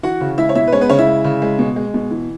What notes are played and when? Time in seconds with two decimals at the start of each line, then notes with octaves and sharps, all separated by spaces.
0.03 E3 F#4 F#5
0.21 C#3
0.38 G#3 E4 E5
0.49 C#5
0.55 B2 E4 E5
0.67 B4
0.72 G#3 C#4 C#5
0.81 B3 B4
0.90 C#3 C#4 C#5
0.99 E4 E5
1.07 G#3
1.24 C#3
1.42 G#3
1.59 B2
1.76 G#3
1.94 B2
2.11 E3